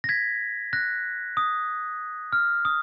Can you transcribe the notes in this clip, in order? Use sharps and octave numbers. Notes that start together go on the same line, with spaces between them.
A#6
G#6 B6
F#6 A#6
D#6
F6
D#6